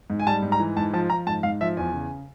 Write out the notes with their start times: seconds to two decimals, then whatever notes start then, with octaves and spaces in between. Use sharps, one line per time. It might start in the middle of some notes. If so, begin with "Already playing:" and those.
0.10 G#2
0.20 G#5
0.27 G3 A5
0.43 G#2
0.52 A#5
0.60 E3
0.77 G#2 A5
0.93 F3 A5
1.10 F3 A#5
1.27 G#2 A5
1.43 G#2 F5
1.61 F3 E5
1.77 E2 G#5
1.94 C#3